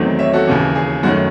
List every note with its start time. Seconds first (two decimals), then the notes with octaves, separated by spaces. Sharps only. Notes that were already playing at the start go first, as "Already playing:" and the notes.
Already playing: E2 D#3 F#3 A3 C4
0.19 C#5 E5
0.33 F#4 A4
0.47 D#2 C#3 E3
0.75 G#4
1.03 F#2 D#3 A3 C#4 F#4